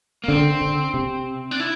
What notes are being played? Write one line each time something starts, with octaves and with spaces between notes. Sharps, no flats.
A#3
D3 C4
D3
C3
D4
E4